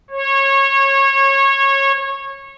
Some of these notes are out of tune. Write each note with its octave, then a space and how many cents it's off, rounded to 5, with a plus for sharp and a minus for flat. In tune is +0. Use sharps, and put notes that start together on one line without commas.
C#5 -25